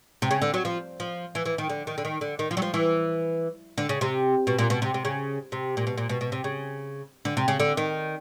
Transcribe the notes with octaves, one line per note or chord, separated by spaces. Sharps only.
C3
C#3
D3
F#3
F3
F3
E3
E3
D#3
D3
D#3
D3
D#3
D3
D#3
F3
F#3
F3
E3
D3
C#3
C3
B2
A#2
B2
C3
C3
C#3
C3
A#2
B2
A#2
B2
B2
C3
C#3
D3
C3
C#3
D3
D#3